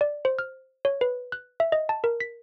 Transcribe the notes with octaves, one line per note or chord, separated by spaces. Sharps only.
D5
C5
F6
C#5
B4
F#6
E5
D#5
A5
A#4
B6